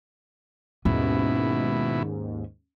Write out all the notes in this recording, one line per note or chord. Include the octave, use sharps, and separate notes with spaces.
D#2 G#2 B2 C#4 E4